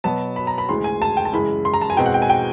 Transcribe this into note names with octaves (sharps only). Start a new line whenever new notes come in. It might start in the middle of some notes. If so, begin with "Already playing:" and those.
B2 F#3 B3 A5
B5
A#5
B5
D2 C#3 E3 G#3 C6
G#5
A5
G5
A5
F#2 C#3 E3 G#3 B5
C6
A#5
A5
G#5
E2 B2 G#3 C4 G5
F#5
G5
G#5
G5